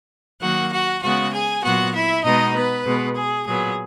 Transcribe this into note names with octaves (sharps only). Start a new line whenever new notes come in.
D#3 F#3 A#3 F#4 F#5
F#4 F#5
C#3 G#3 B3 F#4 F#5
G#4 G#5
A#2 F#3 B3 F#4 F#5
E4 E5
B2 G#3 B3 D#4 D#5
B3 B4
B2 G#3 B3
G#4
A#2 F#3 B3 G#4